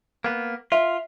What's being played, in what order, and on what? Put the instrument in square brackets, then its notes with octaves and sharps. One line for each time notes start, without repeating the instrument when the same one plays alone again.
[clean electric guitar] A#3 B3
[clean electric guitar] F4 [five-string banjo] E5